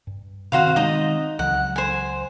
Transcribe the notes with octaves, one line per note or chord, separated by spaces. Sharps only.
G2
C3 D#3 C4 F#4 C5 F5
D#3 G#3 C4 D#4 D#5
C#2 E3 F#3 F#5
C5 G#5